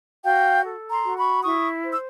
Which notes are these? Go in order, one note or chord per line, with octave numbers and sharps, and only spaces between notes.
F#4 F5 G5
A4
A#5 C6
F#4
B5 C#6
E4 C#6 D#6
C5
E6